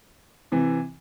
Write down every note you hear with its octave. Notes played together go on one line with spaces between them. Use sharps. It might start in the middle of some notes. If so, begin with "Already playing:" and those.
C3 E3